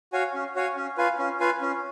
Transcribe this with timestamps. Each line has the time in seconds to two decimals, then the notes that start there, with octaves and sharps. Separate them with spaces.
0.13 F#4 C#5 F5 G#5
0.34 C#4
0.55 F#4 C#5 F5 G#5
0.77 C#4
0.97 F4 B4 F5 G#5
1.19 C#4
1.40 F4 B4 F5 G#5
1.62 C#4